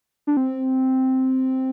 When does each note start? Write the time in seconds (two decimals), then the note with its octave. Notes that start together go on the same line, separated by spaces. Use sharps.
0.27 D4
0.37 C4